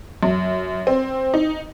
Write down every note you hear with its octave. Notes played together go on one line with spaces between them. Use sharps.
F#2
C4
D#4